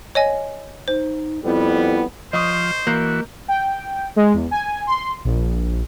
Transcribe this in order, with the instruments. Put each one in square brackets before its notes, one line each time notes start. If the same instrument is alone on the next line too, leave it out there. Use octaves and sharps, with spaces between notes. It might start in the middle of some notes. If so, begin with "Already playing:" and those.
[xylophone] C#5 D#5 G#5
[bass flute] D#4 [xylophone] C5
[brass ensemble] F2 G3 B3 [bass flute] E4
[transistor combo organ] F3 [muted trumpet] C5 [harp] D#5 C#6 D#6
[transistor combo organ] E3 F#4 [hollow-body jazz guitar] A#3 [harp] G6
[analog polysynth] G5
G#3
E2
G#5
C6
A#1